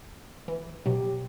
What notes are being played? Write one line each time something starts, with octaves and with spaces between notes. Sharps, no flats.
E3
B2 F#3 G4